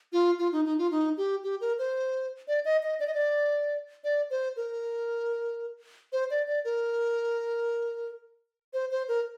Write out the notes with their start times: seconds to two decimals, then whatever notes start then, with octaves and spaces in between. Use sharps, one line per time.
0.13 F4
0.39 F4
0.52 D#4
0.65 D#4
0.78 F4
0.91 D#4
1.17 G4
1.43 G4
1.61 A#4
1.78 C5
2.48 D5
2.65 D#5
2.83 D#5
3.00 D5
3.07 D#5
3.14 D5
4.04 D5
4.30 C5
4.56 A#4
6.12 C5
6.30 D5
6.47 D5
6.65 A#4
8.73 C5
8.91 C5
9.08 A#4